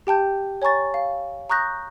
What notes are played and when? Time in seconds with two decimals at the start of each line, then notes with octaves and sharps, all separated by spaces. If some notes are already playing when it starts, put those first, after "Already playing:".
0.07 G4 G5 A5 G6
0.62 C#5 G#5 A#5 C#6 A6
0.94 F5
1.50 A#5 C#6 D#6 F#6 G6 A#6